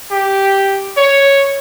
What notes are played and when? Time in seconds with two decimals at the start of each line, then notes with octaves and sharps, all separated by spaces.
0.11 G4
0.97 C#5